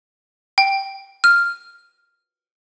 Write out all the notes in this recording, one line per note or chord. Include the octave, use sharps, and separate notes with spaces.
G5
F6